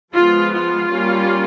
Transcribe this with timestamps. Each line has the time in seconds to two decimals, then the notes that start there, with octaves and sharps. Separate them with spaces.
0.13 F3 G#3 B3 F4
0.53 F4
0.90 G3 A#3 C#4